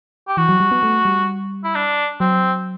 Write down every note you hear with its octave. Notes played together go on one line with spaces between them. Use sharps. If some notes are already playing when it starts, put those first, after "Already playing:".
G4
E3 F#4
F#3
G3
B3
A3
G3
E4
D4
F#3 C4